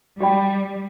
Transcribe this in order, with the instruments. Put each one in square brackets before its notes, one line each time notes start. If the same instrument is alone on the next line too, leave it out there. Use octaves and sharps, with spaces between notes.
[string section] G3 [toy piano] G4 D5 G5 B5